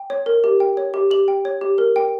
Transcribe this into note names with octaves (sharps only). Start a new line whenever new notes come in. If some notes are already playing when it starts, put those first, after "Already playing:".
Already playing: G5
C#5
A#4
G4
G5
C#5
G4
G4 F#7
G5
C#5
G4
A#4
G5